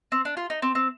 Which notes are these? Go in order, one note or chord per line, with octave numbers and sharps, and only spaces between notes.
C4
D4
F4
D#4
C4
C4